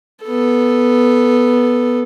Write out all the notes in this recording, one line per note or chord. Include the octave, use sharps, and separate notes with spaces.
B3 A4